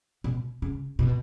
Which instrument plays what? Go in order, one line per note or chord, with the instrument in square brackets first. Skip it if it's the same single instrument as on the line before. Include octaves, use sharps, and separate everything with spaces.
[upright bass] B2
C#3
B2